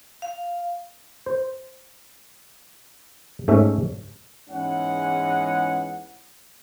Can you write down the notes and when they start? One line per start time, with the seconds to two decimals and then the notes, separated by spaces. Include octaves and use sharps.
0.22 F5
1.26 C5
3.48 G#2 A3 C#4 E5
4.49 E2 G#2 E3 G#3 C#4 F#5